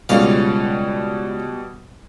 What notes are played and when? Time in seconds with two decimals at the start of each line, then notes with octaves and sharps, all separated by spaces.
0.09 C#2 B2 G3 F5